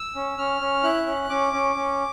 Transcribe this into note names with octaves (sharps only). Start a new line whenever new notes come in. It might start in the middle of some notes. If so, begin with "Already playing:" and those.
Already playing: E6
C#4
C#4 F6
C#4
E4 F#6
C#4
C#4 D6
C#4
C#4